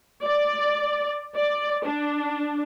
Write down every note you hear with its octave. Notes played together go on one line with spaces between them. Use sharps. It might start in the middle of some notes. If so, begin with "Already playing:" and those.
D5
D5
D4